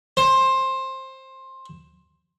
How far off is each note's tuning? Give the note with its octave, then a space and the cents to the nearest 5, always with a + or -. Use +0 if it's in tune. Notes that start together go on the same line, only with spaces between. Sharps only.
C5 +15